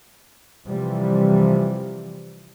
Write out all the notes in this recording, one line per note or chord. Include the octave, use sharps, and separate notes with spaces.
C3 E3 F3 G3